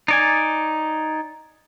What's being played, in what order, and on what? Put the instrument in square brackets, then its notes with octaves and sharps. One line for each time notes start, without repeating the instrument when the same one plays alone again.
[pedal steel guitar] D#4 D5 G#5